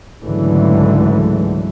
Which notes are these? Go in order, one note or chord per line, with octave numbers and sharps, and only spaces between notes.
C#2 G#2 D3 E3 F#3 A3